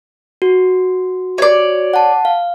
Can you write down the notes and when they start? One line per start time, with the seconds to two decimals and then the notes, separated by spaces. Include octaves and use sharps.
0.42 F#4
1.38 C#5 D5
1.94 F#5 A5
2.25 F5